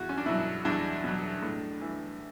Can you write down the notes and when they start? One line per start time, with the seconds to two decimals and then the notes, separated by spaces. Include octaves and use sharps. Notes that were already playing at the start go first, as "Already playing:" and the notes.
Already playing: E2 F#4
0.09 C#4
0.18 D4
0.26 B2 F#3 E4
0.65 E2 D4
1.04 B2 F#3
1.42 A2
1.81 E3